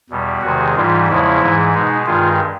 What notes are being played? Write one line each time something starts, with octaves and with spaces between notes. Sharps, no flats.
E2 B2 G3
E2 C3 D#3 G#3 F#4
G#2 E3 G3 F4
E2 C#3 F3 G#3 E4
G#2 E3 G#3
B2 G#3 D#4
G2 D#3 G#3 F4